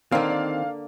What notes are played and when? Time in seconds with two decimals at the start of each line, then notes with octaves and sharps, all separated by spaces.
0.12 D3 D#3 A#3 C4 F5
0.30 D5